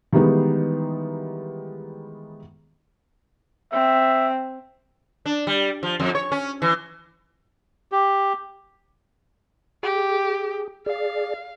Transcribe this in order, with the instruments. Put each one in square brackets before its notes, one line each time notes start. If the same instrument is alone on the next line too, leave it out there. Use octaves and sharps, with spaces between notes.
[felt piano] D#3 E3 G3 G#3 B3 D#4
[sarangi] C4 [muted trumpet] E5
[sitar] D4
G3
F3
F2
C#5
C#4
E3
[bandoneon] G4
[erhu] G4 [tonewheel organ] G#4
[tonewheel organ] G#4 D5 [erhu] F5